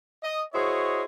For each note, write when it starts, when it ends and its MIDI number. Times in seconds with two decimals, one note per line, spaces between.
0.23 0.42 75
0.54 1.04 64
0.54 1.04 66
0.54 1.04 68
0.54 1.04 72
0.54 1.04 73
0.54 1.04 75